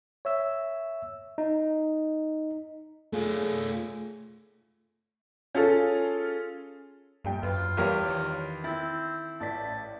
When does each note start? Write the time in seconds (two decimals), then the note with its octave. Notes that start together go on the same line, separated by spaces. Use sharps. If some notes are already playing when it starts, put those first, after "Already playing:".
0.25 C#5 E5 E6
1.38 D#4
3.13 A3 F4 G#4
5.54 C#4 F4 G#4 A4
7.24 A#1 G2 G3 G5
7.43 F#2 F4 B4
7.77 E2 G3 G4 A#4 C#5 F5
8.09 D#3
8.64 C4 E4 G6 A6
9.40 A1 D5 A5 B6